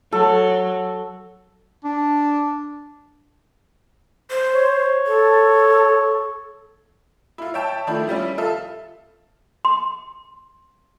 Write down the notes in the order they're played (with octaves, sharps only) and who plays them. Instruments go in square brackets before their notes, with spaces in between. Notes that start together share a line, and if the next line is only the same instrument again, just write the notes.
[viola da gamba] F#3 [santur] A4
[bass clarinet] D4
[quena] C5
[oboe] C#5
[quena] A4
[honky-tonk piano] E4 F4
C#5 E5 G5 A5
D#3 F3 A3 D4 E4
F3 G3 C#4 E4
F4 A4 E5
[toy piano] C6